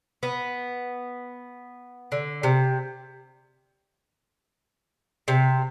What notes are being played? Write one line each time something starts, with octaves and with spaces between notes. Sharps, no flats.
B3
D3
C3
C3